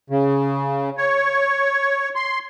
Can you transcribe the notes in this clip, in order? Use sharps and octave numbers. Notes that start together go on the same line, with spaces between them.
C#3
C#5
C6